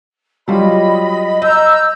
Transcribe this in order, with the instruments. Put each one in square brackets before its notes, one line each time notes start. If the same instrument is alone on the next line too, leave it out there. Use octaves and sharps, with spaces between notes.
[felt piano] F#3 G3 F4 [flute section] D#5 B5
[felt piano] D#5 [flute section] A#5 E6 G6